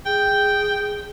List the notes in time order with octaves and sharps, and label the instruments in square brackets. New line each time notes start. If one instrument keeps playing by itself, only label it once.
[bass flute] G#4 [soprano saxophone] G5